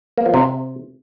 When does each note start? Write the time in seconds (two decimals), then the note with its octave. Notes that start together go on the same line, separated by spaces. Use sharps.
0.18 A#3
0.26 F3
0.34 C3